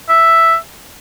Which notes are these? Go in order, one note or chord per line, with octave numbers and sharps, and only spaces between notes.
E5